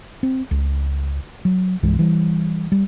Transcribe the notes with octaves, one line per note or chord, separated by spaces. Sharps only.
C4
C#2
F#3
C2 G2 E3 G#3
E3 G3
G3